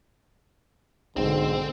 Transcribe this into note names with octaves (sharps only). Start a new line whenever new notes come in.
B1 G#2 D3 C4